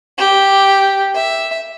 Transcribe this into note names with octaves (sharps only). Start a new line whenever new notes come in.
G4
E5